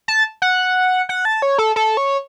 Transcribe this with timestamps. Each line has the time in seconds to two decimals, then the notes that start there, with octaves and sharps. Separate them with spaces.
0.08 A5
0.42 F#5
1.09 F#5
1.25 A5
1.42 C#5
1.58 A4
1.76 A4
1.97 C#5